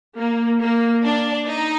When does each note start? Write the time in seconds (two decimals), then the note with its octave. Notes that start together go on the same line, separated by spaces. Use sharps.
0.18 A#3
0.61 A#3
1.05 D4
1.48 D#4